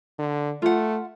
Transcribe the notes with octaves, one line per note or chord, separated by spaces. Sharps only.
D3
A3 F4 F#5